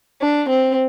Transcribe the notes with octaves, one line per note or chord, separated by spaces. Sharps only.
D4
C4